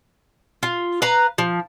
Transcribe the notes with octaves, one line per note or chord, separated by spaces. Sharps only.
F4
B4 F5 A#5
F3